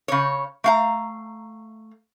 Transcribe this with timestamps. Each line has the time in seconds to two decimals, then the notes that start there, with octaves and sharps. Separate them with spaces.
0.08 C#3 C#5
0.64 A3 F5 A#5